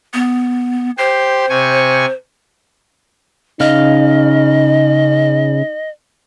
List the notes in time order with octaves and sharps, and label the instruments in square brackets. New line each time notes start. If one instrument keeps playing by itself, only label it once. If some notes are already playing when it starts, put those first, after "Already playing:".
[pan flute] B3
[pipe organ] G4 C6 [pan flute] C5
[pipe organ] C3 G#5 C#6
[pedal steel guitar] C#3 F5 [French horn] D#4 [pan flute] D#5